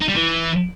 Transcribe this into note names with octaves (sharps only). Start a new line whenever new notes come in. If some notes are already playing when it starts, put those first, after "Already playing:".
D#4
G3
E3